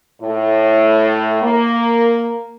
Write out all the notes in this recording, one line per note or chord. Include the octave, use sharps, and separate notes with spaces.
A2
A#3